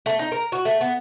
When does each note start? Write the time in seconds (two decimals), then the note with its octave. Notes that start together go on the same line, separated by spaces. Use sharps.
0.06 A3
0.19 D#4
0.32 A#4
0.52 F#4
0.65 A3
0.81 B3